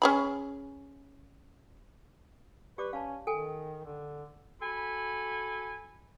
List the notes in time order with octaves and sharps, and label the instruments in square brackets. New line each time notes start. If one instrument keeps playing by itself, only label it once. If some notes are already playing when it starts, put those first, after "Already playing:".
[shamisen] C#4 G#4 B5
[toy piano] G4 D5 D6 [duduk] B4
[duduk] C#4 [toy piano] F5 A5
[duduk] D#3 [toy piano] A4 G5 G#5
[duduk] D3
[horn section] F#4 A4 G#5 B5